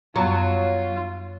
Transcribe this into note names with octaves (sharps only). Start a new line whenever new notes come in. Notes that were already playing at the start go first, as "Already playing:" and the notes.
F#2 F#3 B3 F4 A#5